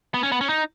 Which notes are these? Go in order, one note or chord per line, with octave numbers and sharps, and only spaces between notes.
B3
C#4
B3
C#4
D#4